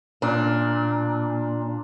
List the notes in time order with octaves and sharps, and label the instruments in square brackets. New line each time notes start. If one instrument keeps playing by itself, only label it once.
[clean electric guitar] A#2 [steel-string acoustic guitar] D4